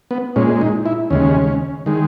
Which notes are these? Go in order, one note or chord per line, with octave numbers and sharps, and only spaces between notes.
B3
A#2 G#3 C#4
D#4
E4
D#2 C#3 G#3 C#4
D#3 G#3